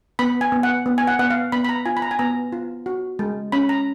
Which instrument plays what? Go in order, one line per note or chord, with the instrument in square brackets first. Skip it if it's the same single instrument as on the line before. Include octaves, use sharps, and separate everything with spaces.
[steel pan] B3 B5
G#5
B3
F#5
B3
G#5
F#5
B3 F#5
F5
B3 B5
B5
A#5
F4 G#5
B5
A#5
G#5
B3 A#5
F4
F#4
G#3
C#4 B5
A#5